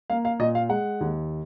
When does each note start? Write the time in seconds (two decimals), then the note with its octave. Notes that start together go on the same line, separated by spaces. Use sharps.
0.10 A#3 F5
0.25 F5
0.39 A#2 D#5
0.55 F5
0.69 G#3 F#5
1.01 D#2